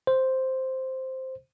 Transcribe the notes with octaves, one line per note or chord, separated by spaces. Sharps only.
C5